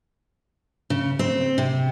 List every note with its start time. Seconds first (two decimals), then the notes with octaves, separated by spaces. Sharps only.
0.90 C#3
1.19 C4
1.58 C3